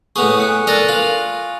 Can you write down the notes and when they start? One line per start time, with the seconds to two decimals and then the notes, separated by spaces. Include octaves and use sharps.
0.16 A2 B3 G#4 C#6 D#6 F7
0.40 G#5 F#6 C#7
0.67 D4 A4 A#4 A6 A#6 D#7
0.89 F4 F#7